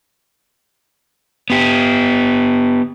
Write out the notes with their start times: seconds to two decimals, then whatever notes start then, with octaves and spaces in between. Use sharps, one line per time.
1.50 B3 G4